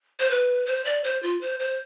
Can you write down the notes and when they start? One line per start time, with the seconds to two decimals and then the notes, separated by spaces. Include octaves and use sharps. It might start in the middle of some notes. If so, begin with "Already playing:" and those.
0.19 C5
0.31 B4
0.66 C5
0.85 D5
1.04 C5
1.23 F4
1.41 C5
1.60 C5